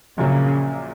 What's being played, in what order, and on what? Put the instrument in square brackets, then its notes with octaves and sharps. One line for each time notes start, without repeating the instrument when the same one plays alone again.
[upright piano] A#1 A#2 F#3 A#3 [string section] C#3